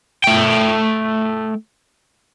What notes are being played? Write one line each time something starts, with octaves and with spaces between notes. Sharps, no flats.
A3 G5